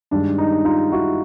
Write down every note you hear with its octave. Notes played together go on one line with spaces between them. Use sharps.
G2 D#3 G#3 D4
D#4
D#4 F4
E4 F#4